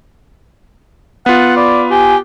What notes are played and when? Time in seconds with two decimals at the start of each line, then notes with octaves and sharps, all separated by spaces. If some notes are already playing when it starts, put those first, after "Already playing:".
1.26 B3 F4 F#5
1.57 D5 B5
1.90 G4 G#5